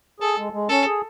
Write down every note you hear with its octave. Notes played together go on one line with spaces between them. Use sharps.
G#4 A4
G#3
G#3
C#4 A4
G#4